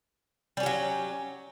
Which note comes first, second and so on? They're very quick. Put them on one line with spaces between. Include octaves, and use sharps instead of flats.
G3 C#4 G4 F#3